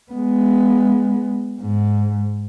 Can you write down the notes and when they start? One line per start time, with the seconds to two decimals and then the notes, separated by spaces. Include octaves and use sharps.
0.12 G#3 B3
1.61 G#2